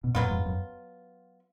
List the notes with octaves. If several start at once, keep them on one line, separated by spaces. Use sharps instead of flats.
B2
F#2 A#2 F#3 B3 F4
F2 G#2
F#2